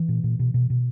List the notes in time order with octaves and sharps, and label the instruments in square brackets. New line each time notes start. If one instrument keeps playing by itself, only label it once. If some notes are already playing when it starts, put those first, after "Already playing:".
Already playing: [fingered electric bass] E3
A#2
A#2
B2
B2
B2